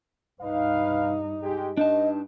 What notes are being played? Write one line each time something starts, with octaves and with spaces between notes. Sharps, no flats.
G2 D#4 B4 F5
G#3 G4
G2 D4 D#4 D#5 A5